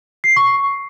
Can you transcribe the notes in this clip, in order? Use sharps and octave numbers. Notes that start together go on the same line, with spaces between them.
C7
C#6